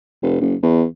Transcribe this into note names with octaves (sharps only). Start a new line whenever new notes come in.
F1
F#1
E2